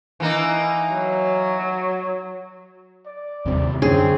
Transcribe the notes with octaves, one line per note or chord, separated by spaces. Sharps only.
E3 A#3 D#4
F#3
D5
D#2 C3 G3
F#2 D3 C4 C#4 G#4